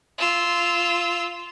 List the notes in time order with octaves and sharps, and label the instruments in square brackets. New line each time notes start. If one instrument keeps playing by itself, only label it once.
[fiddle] F4 E6